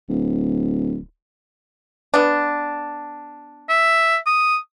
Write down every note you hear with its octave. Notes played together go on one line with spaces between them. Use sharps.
D1
B3 D4
E5
D#6